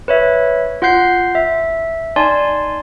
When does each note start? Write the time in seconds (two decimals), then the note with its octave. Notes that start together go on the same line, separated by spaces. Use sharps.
0.08 B4 C#5 E5
0.82 F4 F#5 F#6 G6 C7
1.35 E5
2.16 D#4 D5 G#5 A5 C6